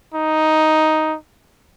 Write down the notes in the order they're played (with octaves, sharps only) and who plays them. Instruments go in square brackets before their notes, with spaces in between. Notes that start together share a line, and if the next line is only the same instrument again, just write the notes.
[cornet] D#4